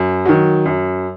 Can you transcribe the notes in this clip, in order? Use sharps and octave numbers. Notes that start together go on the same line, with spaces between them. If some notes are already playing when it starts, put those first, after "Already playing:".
Already playing: F#2
D#3 F#3
F#2